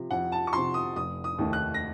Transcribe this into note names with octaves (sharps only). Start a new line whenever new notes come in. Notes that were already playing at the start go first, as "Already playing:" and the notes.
Already playing: C3 F3
F2 F#5
A5
C#6
C3 F3 C6
D#6
F1 D#6
D#6
D#2 D#3 A3
F#6
A#6